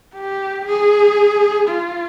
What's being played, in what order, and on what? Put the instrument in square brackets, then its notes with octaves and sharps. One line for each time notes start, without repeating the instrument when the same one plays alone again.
[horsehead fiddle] G4
G#4
F4